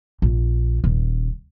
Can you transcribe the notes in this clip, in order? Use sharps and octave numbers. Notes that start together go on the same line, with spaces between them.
A#1
D#1